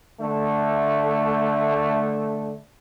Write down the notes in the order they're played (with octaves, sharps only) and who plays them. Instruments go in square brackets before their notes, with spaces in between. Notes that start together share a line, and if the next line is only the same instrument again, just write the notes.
[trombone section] D3 A3